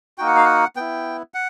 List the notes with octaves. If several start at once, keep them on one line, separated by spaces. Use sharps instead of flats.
A#3 D#4 F#4 G5
F#5
F5
F#5
B3 E4 G5
F#5